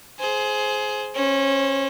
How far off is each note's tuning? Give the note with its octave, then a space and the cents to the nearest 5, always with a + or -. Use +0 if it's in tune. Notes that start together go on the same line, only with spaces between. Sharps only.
G#4 +20 C5 +0
C#4 -20 C5 +0